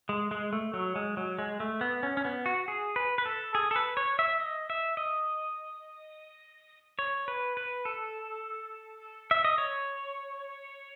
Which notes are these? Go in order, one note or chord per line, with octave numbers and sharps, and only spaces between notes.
G#3
G#3
A3
F#3
G#3
F#3
G#3
A3
B3
C#4
C#4
B3
F#4
G#4
B4
B4
A4
G#4
A4
B4
C#5
E5
D#5
E5
D#5
C#5
B4
B4
A4
E5
D#5
C#5